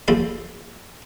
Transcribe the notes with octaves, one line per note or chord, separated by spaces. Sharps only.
D#2 F3 G#4 A4 F5